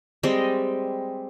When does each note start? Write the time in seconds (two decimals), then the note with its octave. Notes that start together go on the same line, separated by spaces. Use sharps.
0.23 G3 G#3 C4 D#5